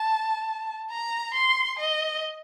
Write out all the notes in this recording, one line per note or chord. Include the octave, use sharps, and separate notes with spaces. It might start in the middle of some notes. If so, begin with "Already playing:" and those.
Already playing: A5
A#5
C6
D#5